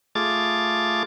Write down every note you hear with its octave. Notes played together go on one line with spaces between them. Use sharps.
A3 F4 G#4 D6 A6